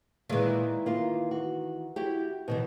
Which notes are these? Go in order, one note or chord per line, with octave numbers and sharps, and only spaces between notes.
A#2 D#3 E3 G#3
A#3 F4
F#4
E4 F#4 G4
B2 D#3 E3